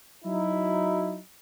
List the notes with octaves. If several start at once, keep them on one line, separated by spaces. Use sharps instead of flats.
F#3 D#4 E4